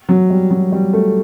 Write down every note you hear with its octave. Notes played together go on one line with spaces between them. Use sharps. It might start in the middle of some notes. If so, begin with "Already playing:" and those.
F#3
G3
F#3
G3
A3